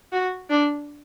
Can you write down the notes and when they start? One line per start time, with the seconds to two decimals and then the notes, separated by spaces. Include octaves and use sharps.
0.12 F#4
0.50 D4